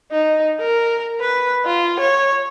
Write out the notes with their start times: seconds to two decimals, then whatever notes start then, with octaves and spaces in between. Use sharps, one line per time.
0.12 D#4
0.60 A#4
1.21 B4
1.66 F4
2.00 C#5